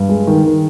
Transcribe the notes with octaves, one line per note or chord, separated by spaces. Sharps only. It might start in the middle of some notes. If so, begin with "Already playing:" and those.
Already playing: G2
G#3
D#3
D#3